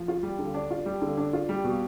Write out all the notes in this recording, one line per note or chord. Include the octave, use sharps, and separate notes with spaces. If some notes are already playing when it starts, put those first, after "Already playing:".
Already playing: F3
F4
G3
D3
D4
F4
G3
D3
D4
F4
G3
B2